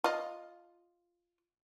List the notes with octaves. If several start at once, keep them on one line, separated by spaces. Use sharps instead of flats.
F4 D#5